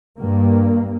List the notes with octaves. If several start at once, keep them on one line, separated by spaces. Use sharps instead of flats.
G2 A#3